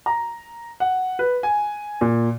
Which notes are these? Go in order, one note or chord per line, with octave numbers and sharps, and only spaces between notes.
A#5
F#5
B4
G#5
A#2